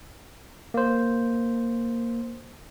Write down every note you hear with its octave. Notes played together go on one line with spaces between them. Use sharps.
A#3 C5